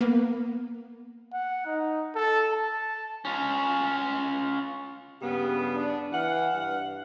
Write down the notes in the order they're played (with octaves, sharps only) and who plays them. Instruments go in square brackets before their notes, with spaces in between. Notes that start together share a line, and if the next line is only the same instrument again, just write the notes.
[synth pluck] A#3 B3
[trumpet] F#5
D#4
A4
A5
[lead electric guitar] C#4 F4
[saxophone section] G2 C#3 B3 [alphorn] G4
[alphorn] D4
[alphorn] E3 [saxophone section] F5 F#5
[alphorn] G2